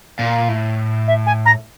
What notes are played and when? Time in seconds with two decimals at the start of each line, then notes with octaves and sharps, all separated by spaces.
0.19 A#2
0.48 A2
1.07 E5
1.26 G#5
1.45 A#5